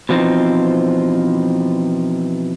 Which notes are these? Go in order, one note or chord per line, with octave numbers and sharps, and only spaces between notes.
B2 E3 F3 G#3 C4 D#4